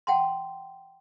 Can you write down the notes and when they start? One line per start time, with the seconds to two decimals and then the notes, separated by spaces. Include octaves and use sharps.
0.07 F#5 G5 A5 C6